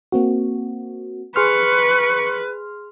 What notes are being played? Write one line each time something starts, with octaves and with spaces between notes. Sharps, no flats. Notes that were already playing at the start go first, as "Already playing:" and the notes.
A#3 C4 F#4
G#4 B4 C6 C#6 F6